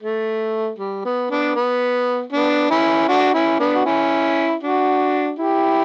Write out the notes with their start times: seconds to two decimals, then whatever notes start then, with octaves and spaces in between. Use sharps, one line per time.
0.03 A3
0.79 G3
1.05 B3
1.30 B3 D4
1.55 B3
2.32 B3 D4
2.70 C#4 E4
3.09 D4 F#4
3.34 C#4 E4
3.60 B3 D4
3.75 F#4
3.85 C#4 E4
4.63 D4 F#4
5.39 E4 G4